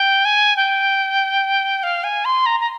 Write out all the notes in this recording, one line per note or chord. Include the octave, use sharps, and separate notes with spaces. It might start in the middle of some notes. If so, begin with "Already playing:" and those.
Already playing: G5
G#5
G5
F5
G#5
C6
A#5
A#5